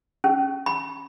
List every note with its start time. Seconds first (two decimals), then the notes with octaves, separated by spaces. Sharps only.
0.24 C#4
0.66 B5